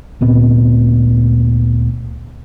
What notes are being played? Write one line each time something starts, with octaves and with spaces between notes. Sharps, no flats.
D2 A#2 B3 C4